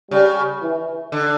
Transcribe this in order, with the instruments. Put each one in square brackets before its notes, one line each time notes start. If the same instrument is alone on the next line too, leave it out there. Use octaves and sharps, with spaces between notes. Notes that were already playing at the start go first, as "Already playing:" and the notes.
[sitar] C#3 [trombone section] G3
[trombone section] E3
[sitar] D3